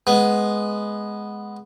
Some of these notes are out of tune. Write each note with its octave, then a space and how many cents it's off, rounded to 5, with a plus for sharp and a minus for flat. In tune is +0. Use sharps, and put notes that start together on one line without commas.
G#3 +5 B3 +0